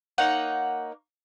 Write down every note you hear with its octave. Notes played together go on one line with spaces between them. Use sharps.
A#3 D#4 C#5 F#5